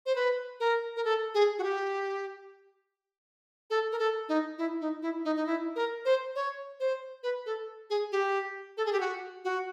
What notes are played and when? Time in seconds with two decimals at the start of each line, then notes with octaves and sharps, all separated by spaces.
0.06 C5
0.15 B4
0.60 A#4
0.96 A#4
1.05 A4
1.34 G#4
1.59 F#4
1.64 G4
3.70 A4
3.92 A#4
3.99 A4
4.29 D#4
4.58 E4
4.81 D#4
5.02 E4
5.25 D#4
5.36 D#4
5.46 E4
5.76 A#4
6.05 C5
6.35 C#5
6.80 C5
7.23 B4
7.46 A4
7.90 G#4
8.12 G4
8.77 A4
8.86 G#4
8.93 G4
9.00 F#4
9.44 F#4